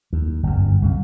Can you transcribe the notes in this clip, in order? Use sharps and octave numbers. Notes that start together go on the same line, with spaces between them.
D#2
G1 F#2
C2 F#2